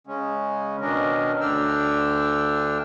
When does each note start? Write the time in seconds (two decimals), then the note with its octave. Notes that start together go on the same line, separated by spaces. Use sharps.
0.07 C#3 G#3 C#4
0.81 B2 D#3 C#4 D4 A#4 D#5
1.40 D2 D3 D4 G5 E6 F6